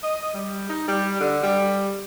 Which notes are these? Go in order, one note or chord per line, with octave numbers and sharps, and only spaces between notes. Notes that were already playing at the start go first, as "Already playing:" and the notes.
D#5
G3
D#4
G3
D3
G3